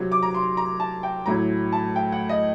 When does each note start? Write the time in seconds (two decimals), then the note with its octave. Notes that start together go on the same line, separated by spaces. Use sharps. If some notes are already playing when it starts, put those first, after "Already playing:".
Already playing: C3 F#3
0.12 D6
0.23 A#5
0.34 C6
0.57 A#5
0.80 A5
1.03 G5
1.26 A2 F#3 A#5
1.72 A5
1.96 G5
2.12 F#5
2.29 D#5